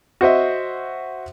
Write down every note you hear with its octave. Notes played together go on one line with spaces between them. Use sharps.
F#4 C5 D#5 E5